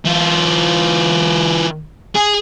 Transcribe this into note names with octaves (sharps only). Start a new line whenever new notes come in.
E3 F4
G#4